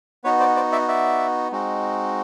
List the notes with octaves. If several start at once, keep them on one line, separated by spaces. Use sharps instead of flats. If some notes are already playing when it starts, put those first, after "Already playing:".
B3 D#4 F#4 B4 C#5
C5 D5
C5 D5
D5 E5
D5 E5
G#3 C4 D#4 F#4